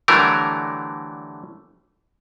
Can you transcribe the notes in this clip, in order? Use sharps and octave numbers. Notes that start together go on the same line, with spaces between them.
D3 E3 F#3 G3 A3 A#4